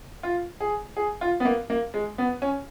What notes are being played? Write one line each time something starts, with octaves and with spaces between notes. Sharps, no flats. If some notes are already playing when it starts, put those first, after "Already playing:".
F4
G#4
G#4
F4
B3
A#3
A#3
G#3
B3
C#4